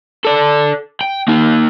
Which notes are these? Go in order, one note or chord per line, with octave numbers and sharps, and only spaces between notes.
A4 D5
G5
A#3 D#4